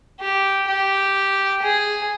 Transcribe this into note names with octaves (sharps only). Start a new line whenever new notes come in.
G4
G4
G#4